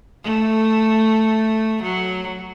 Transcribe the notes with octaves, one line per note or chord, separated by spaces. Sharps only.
A3
F#3